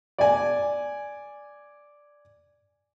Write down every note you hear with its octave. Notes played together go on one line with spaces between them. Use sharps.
D5 G#5